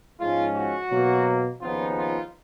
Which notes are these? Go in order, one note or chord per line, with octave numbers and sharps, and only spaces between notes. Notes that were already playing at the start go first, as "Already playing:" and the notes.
G#2 F3 G#3 C#4 F4
F#4
B2 F#3 A#3
D#2 C#3 F3 B3 D#4 F4
F4